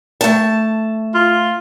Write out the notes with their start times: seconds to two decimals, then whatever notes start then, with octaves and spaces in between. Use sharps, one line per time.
0.21 A3 A5
1.14 F4